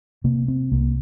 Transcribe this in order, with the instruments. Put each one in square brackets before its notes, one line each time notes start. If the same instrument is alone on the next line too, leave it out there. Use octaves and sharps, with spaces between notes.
[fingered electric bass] C3 A#3
C4
C2 A#3